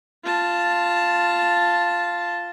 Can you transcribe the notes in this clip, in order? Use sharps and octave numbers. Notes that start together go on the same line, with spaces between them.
F4 A5